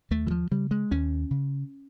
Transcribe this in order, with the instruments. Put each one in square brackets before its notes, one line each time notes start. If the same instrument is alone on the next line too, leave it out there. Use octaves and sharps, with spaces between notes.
[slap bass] D#2 A3
E3
F3
C#3 G3
G#3
D#2 C#4
C#3